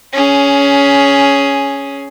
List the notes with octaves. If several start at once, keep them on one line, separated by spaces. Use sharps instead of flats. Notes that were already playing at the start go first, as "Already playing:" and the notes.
C#4 G#4